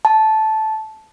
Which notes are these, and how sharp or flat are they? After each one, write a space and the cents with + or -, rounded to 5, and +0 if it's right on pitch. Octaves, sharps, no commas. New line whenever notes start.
A5 -10